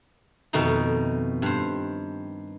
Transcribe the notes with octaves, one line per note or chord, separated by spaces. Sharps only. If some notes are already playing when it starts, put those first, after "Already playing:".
F2 B2 D#3 A3 D#4
G2 C5